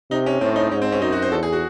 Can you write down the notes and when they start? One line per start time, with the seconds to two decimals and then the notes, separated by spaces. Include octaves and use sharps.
0.11 C3 D#4
0.26 C#4
0.41 A2 C4
0.56 D#4
0.72 G#2 C#4
0.82 C4
0.92 C#4
1.01 F#2 D#4
1.12 F#4
1.22 C5
1.32 E2 A4
1.43 G#4
1.53 F#4